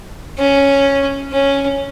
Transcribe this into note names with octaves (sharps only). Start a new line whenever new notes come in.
C#4
C#4